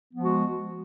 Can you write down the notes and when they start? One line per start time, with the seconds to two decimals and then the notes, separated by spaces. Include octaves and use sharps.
0.11 B3
0.15 F3
0.20 G#3
0.24 F#4